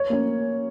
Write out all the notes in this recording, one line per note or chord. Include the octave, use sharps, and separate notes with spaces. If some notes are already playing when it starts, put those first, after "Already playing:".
Already playing: C#5
A#3 C#4